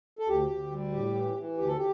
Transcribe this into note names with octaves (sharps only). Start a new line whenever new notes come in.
A4
D2 G4
D2
G3
A2 G4
E3
E3
D2 G4
A4
G4